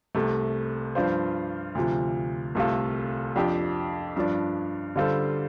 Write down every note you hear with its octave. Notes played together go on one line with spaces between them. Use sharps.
C2 C3 A3
G2 F3 D4 F4 C5
D2 C3 F3
C2 C3 A3 F4 A4
F2 F3 D4 G4
G2 F3 D4
D3 G3 F4 A4 C5